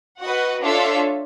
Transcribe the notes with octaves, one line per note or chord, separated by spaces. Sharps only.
F#4 B4 D#5 F#5
D4 F4 A4 C#5 E5